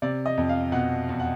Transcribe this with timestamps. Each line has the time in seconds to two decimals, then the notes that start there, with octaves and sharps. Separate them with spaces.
0.02 C3 D5
0.26 D#5
0.37 F2
0.49 F5
0.72 B2 F#5
1.09 E2
1.20 F#5